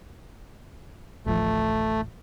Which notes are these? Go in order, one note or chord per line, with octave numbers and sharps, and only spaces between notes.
D1 A1 F3 A3